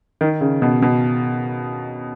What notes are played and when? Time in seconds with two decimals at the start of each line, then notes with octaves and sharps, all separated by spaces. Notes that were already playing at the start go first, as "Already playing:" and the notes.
0.21 D#3
0.41 C#3
0.62 B2
0.82 B2